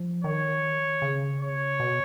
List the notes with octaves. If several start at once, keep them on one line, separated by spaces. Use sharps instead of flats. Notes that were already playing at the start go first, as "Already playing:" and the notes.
Already playing: F3
D#3 C#5
C#3
C#5
B2